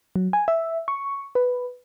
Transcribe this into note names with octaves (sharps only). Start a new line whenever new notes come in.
F#3
G#5
E5
C#6
B4